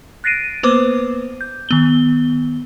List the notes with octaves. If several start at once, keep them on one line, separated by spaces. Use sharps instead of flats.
F#6 A6 A#6 C7 D7 D#7
A#3 B3 B4 C5 D6
G6
D#3 B3 G7